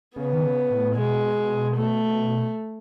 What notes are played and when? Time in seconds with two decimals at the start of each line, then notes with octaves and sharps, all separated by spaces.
0.16 C#3 B3
0.33 D#3
0.44 C#3
0.70 A2
0.95 B2 G#3
1.76 A3